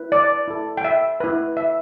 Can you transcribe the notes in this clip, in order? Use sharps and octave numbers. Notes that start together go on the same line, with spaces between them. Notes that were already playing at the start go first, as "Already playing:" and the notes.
Already playing: E4 B4
D5
E4 A4
G5
E5
E4 B4
E5